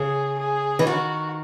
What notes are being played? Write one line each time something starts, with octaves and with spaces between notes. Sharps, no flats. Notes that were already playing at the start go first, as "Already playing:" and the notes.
Already playing: C#3 G#4
G#4
E3
D#3 F#4